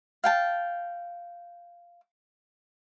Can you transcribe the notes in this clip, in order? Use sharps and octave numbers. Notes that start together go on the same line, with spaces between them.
F5 G5 A5